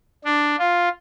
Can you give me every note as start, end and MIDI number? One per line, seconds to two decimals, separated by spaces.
0.25 0.56 62
0.59 0.89 65